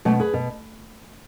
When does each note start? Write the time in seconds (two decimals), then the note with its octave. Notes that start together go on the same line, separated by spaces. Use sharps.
0.05 B2 A3 C#4
0.20 G#4 B4
0.34 B2